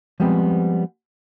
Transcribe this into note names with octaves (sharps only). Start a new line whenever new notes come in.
F3 G3 G#3 B3 C4